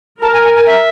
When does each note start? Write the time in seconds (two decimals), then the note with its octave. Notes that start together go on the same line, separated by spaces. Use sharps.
0.21 A#4 A5
0.33 G#5
0.45 G#5
0.56 G#5
0.67 E5